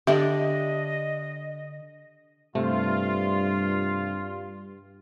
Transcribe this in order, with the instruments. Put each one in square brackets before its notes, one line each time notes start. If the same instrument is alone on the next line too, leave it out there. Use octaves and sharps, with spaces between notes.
[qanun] D3 D4 [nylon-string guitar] G4 [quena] D#5 [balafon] E5
[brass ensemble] G2 [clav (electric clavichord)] C3 A3 [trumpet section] F4